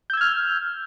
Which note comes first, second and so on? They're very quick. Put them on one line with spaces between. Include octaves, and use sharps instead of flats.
G6 E6 G#6 F6